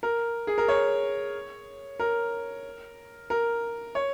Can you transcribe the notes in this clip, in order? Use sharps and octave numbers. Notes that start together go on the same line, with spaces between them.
A#4
G#4
A#4
C#5
A#4
A#4
C#5